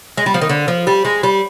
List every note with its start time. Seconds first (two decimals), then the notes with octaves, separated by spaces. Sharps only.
0.17 G#3
0.26 G3
0.34 F3
0.41 D#3
0.49 D3
0.68 F3
0.87 G3
1.05 G#3
1.23 G3